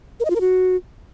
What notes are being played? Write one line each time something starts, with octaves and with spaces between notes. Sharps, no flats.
A#4
D#5
F4
A#4
F#4